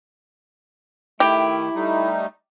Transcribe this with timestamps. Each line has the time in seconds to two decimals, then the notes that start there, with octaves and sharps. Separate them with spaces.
1.20 D#3 A3 E4 G4
1.75 G3 A3 D#4